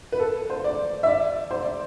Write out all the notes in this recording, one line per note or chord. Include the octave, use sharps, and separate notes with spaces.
B4
A4
C5
D5
E5
D5
C5
D5